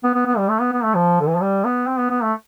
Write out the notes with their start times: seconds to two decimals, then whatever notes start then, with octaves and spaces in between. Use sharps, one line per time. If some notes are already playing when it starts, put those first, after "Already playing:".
0.04 B3
0.14 B3
0.27 B3
0.38 G3
0.49 A3
0.61 B3
0.73 B3
0.84 A3
0.95 F3
1.20 D3
1.28 E3
1.35 F3
1.41 G3
1.65 B3
1.87 C4
1.98 B3
2.10 B3
2.23 A3